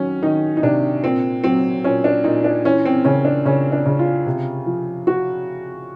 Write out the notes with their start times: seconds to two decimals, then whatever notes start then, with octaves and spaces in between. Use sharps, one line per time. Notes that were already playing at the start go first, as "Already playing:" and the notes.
Already playing: D#3 F#3 C#4
0.22 D#3 D#4
0.57 D#4
0.62 C3 D4
1.03 A#2 C4
1.44 F#3 C4
1.84 A#2 C#4
2.04 D4
2.24 A#2 D#4
2.44 D4
2.65 E3 C#4
2.85 C4
3.05 C#3 C#4
3.25 D4
3.45 C#3 C#4
3.72 D4
3.86 C#3
3.99 F4
4.26 C3
4.66 F3
5.07 F#4